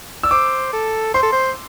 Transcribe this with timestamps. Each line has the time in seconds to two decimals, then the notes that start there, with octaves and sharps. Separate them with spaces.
0.23 D5 E6
0.31 C5 D6
0.73 A4
1.14 C5 C6
1.23 A4
1.32 C5